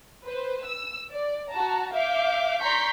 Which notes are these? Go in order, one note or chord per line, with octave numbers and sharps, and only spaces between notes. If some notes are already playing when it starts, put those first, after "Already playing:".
B4 C5
E6
D5
F#4 A5 A#5
E5 F5 D6 G6
D5 A#5 C6 C#6 G6 B6